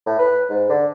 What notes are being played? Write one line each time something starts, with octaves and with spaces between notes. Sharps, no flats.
A2
B4
G#2
D3